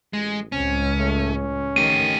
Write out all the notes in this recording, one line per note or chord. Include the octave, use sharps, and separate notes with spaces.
A1 G#3
C#2 A2 C4 C#4
A3
C#4
D#3 A3 G4 D#7